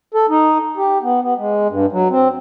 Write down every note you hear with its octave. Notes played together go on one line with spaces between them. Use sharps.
A4
D#4
G4
B3
B3
G#3
G2
F#3
C4